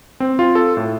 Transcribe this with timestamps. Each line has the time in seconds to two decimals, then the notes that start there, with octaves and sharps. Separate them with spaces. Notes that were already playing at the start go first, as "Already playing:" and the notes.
0.20 C4
0.39 F4
0.55 A4
0.77 A2